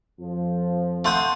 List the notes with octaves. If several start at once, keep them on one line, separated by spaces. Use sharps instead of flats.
F2 F3
A3 F5 F#5 C6 D#6 G6